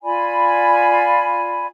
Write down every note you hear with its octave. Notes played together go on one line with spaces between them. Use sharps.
F4 D5 G#5 B5